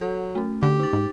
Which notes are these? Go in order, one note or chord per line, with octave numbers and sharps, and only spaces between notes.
F#3 A4
A3 C#4
D3 G4
D#4 A6
G#2